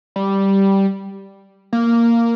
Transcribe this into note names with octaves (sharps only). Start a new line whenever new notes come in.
G3
A#3